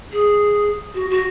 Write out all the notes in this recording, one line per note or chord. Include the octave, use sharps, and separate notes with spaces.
G#4
F#4
F#4